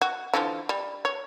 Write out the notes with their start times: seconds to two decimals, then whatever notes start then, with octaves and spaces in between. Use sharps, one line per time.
0.02 F#4
0.34 D3 E3 F3
0.69 G3
1.05 C#5